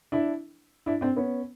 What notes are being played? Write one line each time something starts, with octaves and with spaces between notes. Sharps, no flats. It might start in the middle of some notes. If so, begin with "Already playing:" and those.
D4 E4
D4 E4
C4 D4
B3 C#4